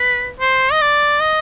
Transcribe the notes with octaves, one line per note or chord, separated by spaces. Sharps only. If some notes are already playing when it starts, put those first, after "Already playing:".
Already playing: B4
C5
D#5
D5
D#5